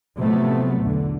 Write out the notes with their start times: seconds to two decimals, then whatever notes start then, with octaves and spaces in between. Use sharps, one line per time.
0.18 A2 C3 F3 F#3 A3 B3
0.83 B1 E2 D3